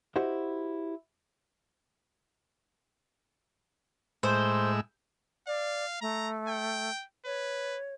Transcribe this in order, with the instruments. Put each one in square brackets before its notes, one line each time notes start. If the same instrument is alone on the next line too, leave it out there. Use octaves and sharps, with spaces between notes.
[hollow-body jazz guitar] E4 F#4 G4 C5 D#5 F#5
[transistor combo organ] A2 G#3 E6 [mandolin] C5
[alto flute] D5 [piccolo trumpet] F5
[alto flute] A3 [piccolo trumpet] A#5
[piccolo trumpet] G5
[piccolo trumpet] B4 [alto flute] C#5